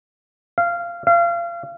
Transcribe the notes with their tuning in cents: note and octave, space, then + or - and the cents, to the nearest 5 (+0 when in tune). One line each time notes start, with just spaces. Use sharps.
F5 -15
F5 -30